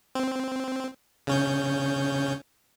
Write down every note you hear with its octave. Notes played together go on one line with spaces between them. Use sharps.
C4
C#3 C#4 G6